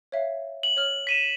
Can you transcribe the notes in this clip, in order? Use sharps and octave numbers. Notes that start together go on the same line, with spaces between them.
C#5 E5 F5
F#7
C#5 F6
B6 D#7 E7